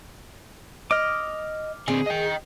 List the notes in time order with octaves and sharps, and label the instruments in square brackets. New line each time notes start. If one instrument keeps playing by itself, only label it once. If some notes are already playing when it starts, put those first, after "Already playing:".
[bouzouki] D#5 [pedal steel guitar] D6 F6
[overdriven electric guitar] D3 C4 [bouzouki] G#4
[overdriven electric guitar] D#5 G5